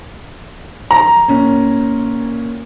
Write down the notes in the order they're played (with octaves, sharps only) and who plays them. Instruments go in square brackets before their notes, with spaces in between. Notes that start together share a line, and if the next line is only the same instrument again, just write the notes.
[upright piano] A#5
[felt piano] A#2 C#4